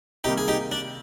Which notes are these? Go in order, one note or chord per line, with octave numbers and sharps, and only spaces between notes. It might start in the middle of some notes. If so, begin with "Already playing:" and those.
C3 D#3 G3 A#3 D#4 G4
G#4
D#4 G4
D4